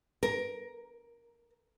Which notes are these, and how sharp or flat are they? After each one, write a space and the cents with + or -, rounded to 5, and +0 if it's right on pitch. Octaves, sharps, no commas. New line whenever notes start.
A#4 +15